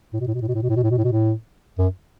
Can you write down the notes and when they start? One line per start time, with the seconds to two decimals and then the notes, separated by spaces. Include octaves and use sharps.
0.13 A2
0.20 B2
0.27 A2
0.34 B2
0.42 A2
0.48 B2
0.55 A2
0.62 B2
0.69 A2
0.76 B2
0.83 A2
0.91 B2
0.98 A2
1.04 B2
1.12 A2
1.78 F#2